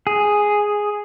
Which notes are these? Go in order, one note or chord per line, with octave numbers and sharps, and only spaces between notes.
G#4